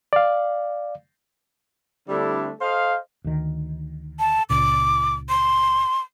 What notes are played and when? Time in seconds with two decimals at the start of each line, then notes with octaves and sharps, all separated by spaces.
0.13 D5 F5
2.09 D3 G3 A3 C4 D4 E4
2.61 A4 C5 D#5 F5
3.24 D2 D#3
4.19 A5
4.50 C#2 A#2 D6
5.29 C6